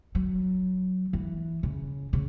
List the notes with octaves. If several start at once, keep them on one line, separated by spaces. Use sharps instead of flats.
F#3
E3
C#3
C#3